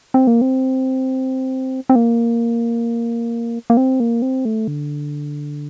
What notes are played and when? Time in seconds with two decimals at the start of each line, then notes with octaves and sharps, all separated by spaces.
0.14 C4
0.27 A#3
0.41 C4
1.90 C4
1.95 A#3
3.70 A#3
3.77 C4
4.00 A#3
4.22 C4
4.45 A3
4.68 D3